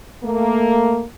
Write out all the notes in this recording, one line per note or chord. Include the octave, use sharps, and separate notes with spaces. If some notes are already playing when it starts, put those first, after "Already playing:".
A3 A#3